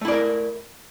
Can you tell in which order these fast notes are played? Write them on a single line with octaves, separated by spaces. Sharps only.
A3 E4 D5 A#4